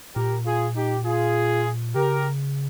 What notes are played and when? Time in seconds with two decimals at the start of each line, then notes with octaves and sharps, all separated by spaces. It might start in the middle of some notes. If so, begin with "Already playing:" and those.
0.16 A#2 G4 A#4
0.46 F4 G#4
0.76 D#4 G4
1.05 F4 G#4
1.95 C#3 G4 A#4